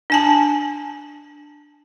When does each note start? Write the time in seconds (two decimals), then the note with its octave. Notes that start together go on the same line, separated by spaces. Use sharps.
0.10 D4 G#5 A5